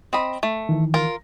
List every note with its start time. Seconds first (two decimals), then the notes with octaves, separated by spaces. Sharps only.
0.13 C4 D#5 B5
0.43 A3
0.69 D#3 E3
0.94 F4 A#4